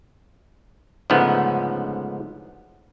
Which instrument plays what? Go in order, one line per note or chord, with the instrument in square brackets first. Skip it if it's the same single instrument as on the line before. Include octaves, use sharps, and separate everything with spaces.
[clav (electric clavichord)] C#2 G#2 D3 F3 A3 B3